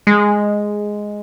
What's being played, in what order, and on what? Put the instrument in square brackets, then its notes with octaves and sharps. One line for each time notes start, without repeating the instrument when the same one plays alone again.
[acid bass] G#3